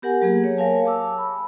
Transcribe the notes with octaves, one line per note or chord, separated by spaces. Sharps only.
B3 G4 A#4 F#5 G#5
F#3 A#3 G#4
C#5
A#4 C#5 F5 G#5 A5
A5 D6 E6
B5